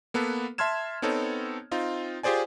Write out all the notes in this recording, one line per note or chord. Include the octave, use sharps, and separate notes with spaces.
A#3 B3 A4 B4
E5 A5 C6 F6 G#6 E7
B3 C4 D#4 A4 C#5
C4 D#4 F4
F4 G4 G#4 C5 D5 G#5